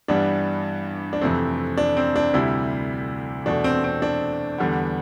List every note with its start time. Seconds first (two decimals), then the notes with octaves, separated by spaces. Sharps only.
0.08 G2 E3 G3 B3 D4
1.13 D4
1.21 F2 C3 E3 A3 C4
1.77 D4
1.97 C4
2.16 D4
2.33 D2 C3 G3 E4
3.46 E2 B2 A3 D4
3.64 C4
3.84 C4
4.02 D4
4.58 E2 D3 G3 B3